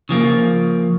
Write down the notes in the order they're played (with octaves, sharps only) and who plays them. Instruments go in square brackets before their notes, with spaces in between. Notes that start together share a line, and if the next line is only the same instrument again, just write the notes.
[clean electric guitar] C#3 F3 A#3